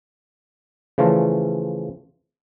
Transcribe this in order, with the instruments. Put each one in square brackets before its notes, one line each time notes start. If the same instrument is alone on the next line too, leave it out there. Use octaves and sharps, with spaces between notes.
[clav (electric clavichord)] C#3 E3 F3 A3 F4